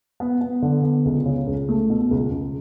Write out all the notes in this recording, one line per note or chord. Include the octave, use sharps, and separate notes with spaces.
B3
B3
D3
B3
C#2
C#3
C#2
A3
B2
C#2
C#2